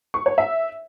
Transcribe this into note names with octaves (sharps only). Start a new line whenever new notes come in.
C#6
C#5
E5